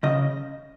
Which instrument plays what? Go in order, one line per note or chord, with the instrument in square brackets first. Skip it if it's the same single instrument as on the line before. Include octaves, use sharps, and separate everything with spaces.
[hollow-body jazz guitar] C#3 D#5